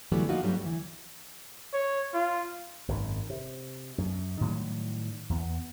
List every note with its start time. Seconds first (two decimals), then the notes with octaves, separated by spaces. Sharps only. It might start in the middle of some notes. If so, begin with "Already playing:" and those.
0.12 D3 E3 F#3 G3 A3 B3
0.29 F3 A#3 D#4 F4 F#4
0.43 G2 F#3 G3 A3 B3 D4
0.62 D2 E3
1.74 C#5
2.14 F4
2.88 G#1 F#2 D#3
3.30 C3
3.98 F#2
4.41 A2 D#3 F#3 G3
5.29 E2 B3